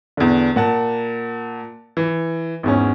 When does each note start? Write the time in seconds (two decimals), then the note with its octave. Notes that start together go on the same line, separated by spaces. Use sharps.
0.17 E2 D3
0.56 A#2 F#5 A5
1.97 E3
2.63 G#1 E2 C#4